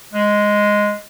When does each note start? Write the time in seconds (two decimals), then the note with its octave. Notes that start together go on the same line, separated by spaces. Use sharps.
0.13 G#3